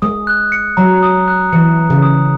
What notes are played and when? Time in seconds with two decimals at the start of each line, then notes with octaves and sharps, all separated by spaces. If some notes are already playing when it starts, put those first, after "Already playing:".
0.02 G#3 D#6
0.27 F#6
0.52 C#7
0.77 F#3 A#5
1.03 D#6
1.28 F#6
1.52 E3 C#7
1.78 A#5
1.90 C#3
2.02 D#6